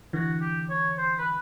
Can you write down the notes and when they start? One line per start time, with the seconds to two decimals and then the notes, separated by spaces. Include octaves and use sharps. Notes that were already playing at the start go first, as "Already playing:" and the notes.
0.13 D3 E3 F#4
0.41 G4
0.70 C#5
0.98 C5
1.18 B4